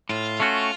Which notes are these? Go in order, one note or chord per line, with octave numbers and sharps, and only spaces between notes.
A2 F4
A3 C#4 F#4